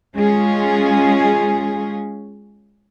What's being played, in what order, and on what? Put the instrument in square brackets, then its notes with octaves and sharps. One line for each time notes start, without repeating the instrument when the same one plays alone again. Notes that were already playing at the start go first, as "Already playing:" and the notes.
[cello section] G#3 C#4 F4 G#4